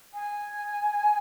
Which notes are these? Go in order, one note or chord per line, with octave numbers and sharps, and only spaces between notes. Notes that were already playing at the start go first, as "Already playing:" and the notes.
G#5